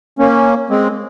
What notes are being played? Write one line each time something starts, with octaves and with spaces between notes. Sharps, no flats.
A#3 C#4
G#3 C4